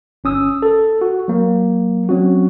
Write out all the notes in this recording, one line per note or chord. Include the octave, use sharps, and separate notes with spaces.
G1 C#4 D#6 E6
A4
F#4
F#3 A#3
F#3 C4 C#4 F#4